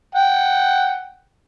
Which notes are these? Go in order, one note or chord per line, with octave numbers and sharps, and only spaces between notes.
F#5 G5